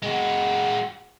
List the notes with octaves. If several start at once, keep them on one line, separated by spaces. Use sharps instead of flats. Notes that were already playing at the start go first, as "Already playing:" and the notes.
G#3 F#4